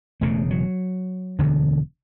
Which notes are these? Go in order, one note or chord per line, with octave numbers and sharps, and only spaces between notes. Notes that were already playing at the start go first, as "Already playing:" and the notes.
E1 E2 C#3 A3
F#3
E1 D2 D3